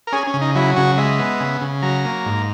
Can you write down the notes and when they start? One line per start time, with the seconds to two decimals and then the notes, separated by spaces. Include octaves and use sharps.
0.07 A#4
0.12 C#4 G#4
0.27 C#4
0.34 C#3
0.41 D#4
0.55 F#3 E4
0.76 C#3 F#4
0.98 G#3 E5
1.19 B3
1.40 C#3
1.61 C#3
1.83 F#3 A#5
2.05 A#3
2.26 G#2